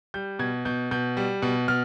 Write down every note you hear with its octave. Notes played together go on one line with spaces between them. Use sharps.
G3 G6
B2 G#6
B2 G6
B2 G6
G3
B2
B2 F6